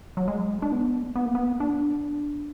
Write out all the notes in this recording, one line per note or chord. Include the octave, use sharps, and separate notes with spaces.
F#3
G#3
D4
B3
B3
A#3
B3
D4